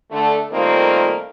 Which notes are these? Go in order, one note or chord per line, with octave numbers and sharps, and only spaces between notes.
D3 A3
D#3 G3 A3 A#3 C4 F4